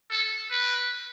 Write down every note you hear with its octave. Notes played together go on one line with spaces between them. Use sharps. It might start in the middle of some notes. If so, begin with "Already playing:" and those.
A4
B4